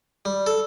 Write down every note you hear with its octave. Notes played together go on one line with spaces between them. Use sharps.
G3
A4